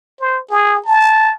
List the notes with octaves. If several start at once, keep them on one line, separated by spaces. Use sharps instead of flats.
C5
G#4
A5